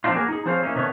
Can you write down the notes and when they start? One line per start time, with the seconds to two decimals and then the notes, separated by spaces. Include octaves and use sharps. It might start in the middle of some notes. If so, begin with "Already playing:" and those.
0.04 F3 F#3 C4 D4 D#4 F4
0.16 A#3 F#4 G#4 A#4
0.28 D#4 G#4
0.46 F3 C4 G#4 C5 C#5 F5
0.62 A#3 C#4 D#4 E4
0.75 C3 D#3 A3 B3 C#5